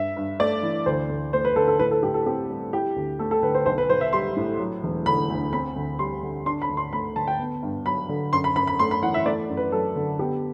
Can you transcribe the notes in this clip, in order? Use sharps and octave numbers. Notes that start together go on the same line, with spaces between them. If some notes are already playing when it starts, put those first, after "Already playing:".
Already playing: G2 E5
G2
A3 D5
E3
D2 C5
D2
A3 C5
B4
D3 A4
A4
A2 B4
A4
A2 G4
A4
C4 G4
G3
E4 G4
D2
A3 A4
A4
D3 B4
C5
B1 C5
B4
B1 C5
E5
G3 C6
A2
F#3
E1
D3 B5
D2
C4 B5
D2
G3 C6
D3
D4 C6
B5
D2
C6
A3 B5
D3 A5
G5
B3
G2
F#3 B5
D3
F#2 C6
B5
F#2 B5
B5
A3 C6
B5
E3 F#5
E5
A3 D5
F#2
B4
F#3 A4
D3
B3 G4